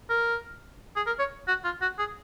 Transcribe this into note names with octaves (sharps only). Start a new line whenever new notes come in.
A#4
G#4
A#4
C#5
F#4
F4
F#4
G#4